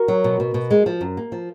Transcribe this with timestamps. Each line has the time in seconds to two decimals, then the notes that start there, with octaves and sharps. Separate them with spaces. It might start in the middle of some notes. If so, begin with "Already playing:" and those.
Already playing: F#4 A#4
0.08 F#3
0.24 B2
0.40 B2
0.54 B2
0.71 G#3
0.86 F3
1.01 F#2
1.17 A#3
1.32 F3